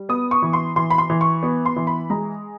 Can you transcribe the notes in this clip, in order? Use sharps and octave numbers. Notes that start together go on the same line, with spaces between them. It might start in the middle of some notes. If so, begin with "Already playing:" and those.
Already playing: G3
B3 D#6
C#6
E3
C6
E3 C6
B5
C6
E3
C#6
B3
C6
E3
B5
G#3 A#5